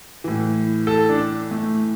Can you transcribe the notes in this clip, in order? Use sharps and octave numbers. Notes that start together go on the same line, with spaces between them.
A2 E3
A4
D4
A3